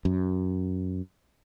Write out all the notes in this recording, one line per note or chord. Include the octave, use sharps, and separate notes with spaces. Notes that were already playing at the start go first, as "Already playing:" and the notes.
F#2